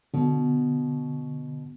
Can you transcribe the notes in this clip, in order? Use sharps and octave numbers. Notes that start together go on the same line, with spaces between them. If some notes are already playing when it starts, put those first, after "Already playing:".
B2 D3